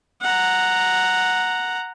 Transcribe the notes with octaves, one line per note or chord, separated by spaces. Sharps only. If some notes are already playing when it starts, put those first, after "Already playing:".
F#5 A#5